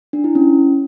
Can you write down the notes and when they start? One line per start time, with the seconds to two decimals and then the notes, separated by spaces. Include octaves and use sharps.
0.13 D4
0.24 E4
0.35 C#4